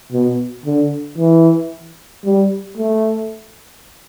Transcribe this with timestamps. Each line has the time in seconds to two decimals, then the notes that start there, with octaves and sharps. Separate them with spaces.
0.12 B2
0.66 D3
1.18 E3
2.25 G3
2.77 A3